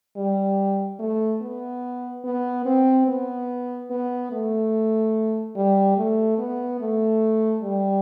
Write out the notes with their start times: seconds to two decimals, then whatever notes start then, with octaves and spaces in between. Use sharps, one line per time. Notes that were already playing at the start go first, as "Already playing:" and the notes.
0.17 G3
0.99 A3
1.42 B3
2.24 B3
2.65 C4
3.07 B3
3.90 B3
4.31 A3
5.56 G3
5.97 A3
6.38 B3
6.80 A3
7.63 G3